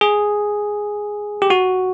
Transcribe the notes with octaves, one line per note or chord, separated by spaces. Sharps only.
G#4
G4
F#4